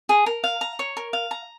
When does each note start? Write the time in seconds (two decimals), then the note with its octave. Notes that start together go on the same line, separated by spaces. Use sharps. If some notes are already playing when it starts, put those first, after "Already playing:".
0.09 G#4
0.26 A#4
0.44 F5
0.61 A#5
0.79 C#5
0.97 A#4
1.13 F5
1.31 A#5